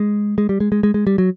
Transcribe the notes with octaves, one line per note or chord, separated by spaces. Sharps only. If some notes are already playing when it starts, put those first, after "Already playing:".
Already playing: G#3
G#3
G3
G#3
G#3
G#3
G#3
G3
F#3